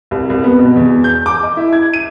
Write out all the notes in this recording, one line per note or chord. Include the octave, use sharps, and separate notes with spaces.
C2
C2
B3
B2
E2
G6
D6
D#5
E4
G#6
D#7